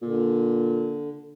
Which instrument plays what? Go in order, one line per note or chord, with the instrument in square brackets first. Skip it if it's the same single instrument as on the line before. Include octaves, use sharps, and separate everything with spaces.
[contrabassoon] A#2 [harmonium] D3